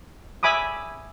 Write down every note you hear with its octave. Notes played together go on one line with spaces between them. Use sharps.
E5 G#5 B5 D6 D#6